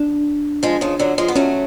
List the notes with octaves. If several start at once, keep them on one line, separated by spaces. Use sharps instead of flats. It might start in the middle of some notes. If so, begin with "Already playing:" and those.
Already playing: D4
F3 G#3
C#3 F3
D3 F#3
F3 G#3
B3
F#3 A3 C#4